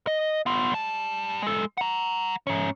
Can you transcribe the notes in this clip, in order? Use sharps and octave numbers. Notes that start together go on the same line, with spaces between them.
D#5
B3 F4
G3 A5
G#3 A4
F#5 A#5
G#2 C#4